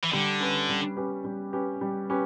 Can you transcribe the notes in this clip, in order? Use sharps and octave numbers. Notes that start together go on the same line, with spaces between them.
E3
D3 G3
C#4 G4 B4
G3
C#4 G4 B4
G3
C#4 G4 B4
G3
C#4 G4 B4